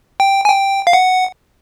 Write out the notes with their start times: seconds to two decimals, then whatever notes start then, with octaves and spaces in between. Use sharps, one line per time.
0.20 G5
0.45 G#5
0.49 G5
0.87 F5
0.93 F#5